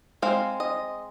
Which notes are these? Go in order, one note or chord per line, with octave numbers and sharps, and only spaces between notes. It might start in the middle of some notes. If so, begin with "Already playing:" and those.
G#3 C4 F5
D#5